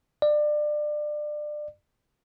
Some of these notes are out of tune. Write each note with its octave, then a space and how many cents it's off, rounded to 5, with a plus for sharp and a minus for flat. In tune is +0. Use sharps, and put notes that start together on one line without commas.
D5 +25